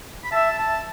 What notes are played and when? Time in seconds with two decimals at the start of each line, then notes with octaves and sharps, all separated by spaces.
0.24 B5
0.32 E5 A5
0.58 A5